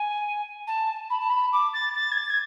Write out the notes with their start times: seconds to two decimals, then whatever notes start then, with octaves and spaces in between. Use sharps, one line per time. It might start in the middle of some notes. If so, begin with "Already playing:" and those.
Already playing: G#5
0.67 A5
1.10 B5
1.20 A5
1.30 B5
1.53 D6
1.74 A6
1.95 A6
2.11 G#6
2.17 A6
2.30 G#6